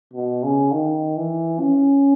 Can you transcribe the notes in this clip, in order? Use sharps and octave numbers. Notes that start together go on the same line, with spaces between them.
B2
C#3
D#3
E3
C#4